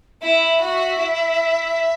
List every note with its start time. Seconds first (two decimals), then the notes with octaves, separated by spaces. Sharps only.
0.21 E4 E5
0.60 F#4
0.98 E4